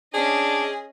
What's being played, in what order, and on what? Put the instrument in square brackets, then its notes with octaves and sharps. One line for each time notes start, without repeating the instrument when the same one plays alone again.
[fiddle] C#4 D#5 [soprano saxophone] D4 [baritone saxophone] G#4